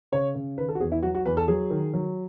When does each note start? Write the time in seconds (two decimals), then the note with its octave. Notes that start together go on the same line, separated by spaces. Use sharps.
0.12 C#3 C#5
0.35 C#3
0.58 D#3 B4
0.69 A4
0.75 F#4
0.80 E2 G#4
0.92 E4
1.03 F#3 F#4
1.15 F#4
1.26 E2 B4
1.37 A4
1.48 F#3 G#4
1.70 D#3
1.94 F#3